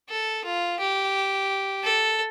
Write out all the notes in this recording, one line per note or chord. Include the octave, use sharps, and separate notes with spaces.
A4
F4
G4
A4